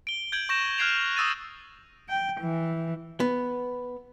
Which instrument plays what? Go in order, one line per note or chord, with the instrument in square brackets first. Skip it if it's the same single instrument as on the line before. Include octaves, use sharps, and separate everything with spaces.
[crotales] D7 G7
G6 G#6 D7 F#7
C#6 G6 A#6 D7 E7
F6 F#6 G#6 C7 D7 F7
C#6 D#6 E6 A6 D#7
[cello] G5
E3
[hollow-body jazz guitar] B3